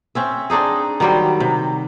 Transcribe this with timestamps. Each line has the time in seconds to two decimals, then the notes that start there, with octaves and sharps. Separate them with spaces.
0.15 C4 C#4 E5
0.50 C4 D4 D#4 G#4
1.00 D#3 F#3 G3 C5
1.40 C3